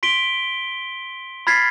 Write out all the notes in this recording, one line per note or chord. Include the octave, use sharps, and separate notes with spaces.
C6 B6 D7 G7
B5 F6 G#6 A6 B6 C7